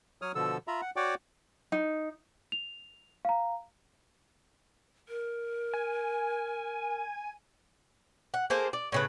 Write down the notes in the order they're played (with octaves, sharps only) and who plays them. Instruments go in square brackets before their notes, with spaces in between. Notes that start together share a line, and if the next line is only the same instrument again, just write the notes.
[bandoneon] F#3 C#5 D#6 F6
B2 D3 F3 A4 E6
F4 E5 A#5 B5
F#5
F#4 C#5 D5 F#5 G5 D6
[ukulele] D#4
[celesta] F7
F5 A#5
[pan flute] A#4
[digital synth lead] G#5
[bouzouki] F#5
A#3 G#4 A4 C5
D5
A2 C#3 B4